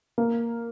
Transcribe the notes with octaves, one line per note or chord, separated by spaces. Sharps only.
A#3